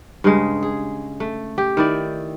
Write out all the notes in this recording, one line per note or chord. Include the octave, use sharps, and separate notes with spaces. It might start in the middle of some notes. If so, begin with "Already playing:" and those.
G2 C#3 G#3
G#4
A3
G4
D#3 E4 D5